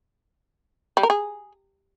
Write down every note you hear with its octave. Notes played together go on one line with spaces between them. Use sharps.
G3
A#4
G#4